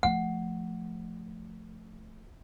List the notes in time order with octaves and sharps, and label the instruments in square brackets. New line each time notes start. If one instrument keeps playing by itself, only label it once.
[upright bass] F3 A3 [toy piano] F#5